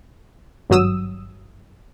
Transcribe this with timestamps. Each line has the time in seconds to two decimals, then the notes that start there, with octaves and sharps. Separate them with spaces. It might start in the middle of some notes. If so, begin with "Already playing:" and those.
0.70 G#1 G2 F#3 D#6 E6